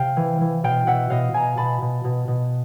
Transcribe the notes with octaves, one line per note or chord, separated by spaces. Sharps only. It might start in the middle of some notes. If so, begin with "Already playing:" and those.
Already playing: C3 F5 G5
E3
E3
B2 F5 G5
B2 E5 F#5
B2 D#5 F5
B2 G#5 A#5
B2 A5 B5
B2
B2
B2